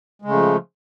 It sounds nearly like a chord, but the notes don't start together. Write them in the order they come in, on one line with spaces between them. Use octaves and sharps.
G#3 C#3 A3 F3